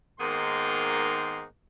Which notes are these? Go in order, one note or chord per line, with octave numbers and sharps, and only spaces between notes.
G#2 D#3 A#3 B3 D#4 C6